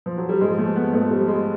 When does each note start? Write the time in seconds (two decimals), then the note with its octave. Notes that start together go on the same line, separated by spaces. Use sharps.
0.06 F3
0.18 F#3
0.29 G3
0.41 G#2 F3 G#3
0.58 A3
0.76 B3
0.93 G#2 F3 A3
1.11 G3
1.28 G#3